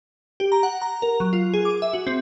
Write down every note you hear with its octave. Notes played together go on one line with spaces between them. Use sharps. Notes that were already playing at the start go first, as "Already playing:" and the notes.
G4
A#5
F#5
A#5
A#4
F#3
F4
G#4
D6
E5
F#4
C4